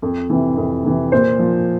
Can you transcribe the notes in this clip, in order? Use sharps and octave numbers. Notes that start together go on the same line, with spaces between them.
F2
C3 E3
F2
C3 E3
A#2 C5
F3